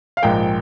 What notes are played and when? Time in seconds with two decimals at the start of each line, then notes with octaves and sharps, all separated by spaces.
0.17 F5
0.22 A#1 G#2 F3 A#3 G5